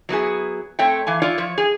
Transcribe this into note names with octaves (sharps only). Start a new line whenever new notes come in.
F#3 B3 E4 G#4
A3 C4 C#5 E5 G5
E3 F5 G#5
E4 F4 C#5 D5 F5
F3 C#5
G#4